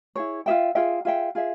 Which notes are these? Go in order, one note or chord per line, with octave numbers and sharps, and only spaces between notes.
E4 G#4 C#5
F4 G#4 E5 G5
F4 G#4 E5 G5
F4 G#4 E5 G5
F4 G#4 E5